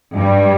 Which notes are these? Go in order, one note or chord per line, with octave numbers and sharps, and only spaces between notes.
G2 G3